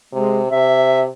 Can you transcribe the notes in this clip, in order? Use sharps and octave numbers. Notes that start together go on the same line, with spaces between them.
C3 G#3
C3 E5